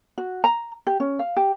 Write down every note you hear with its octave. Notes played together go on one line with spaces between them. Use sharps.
F#4
A#5
G4
C#4
F5
G4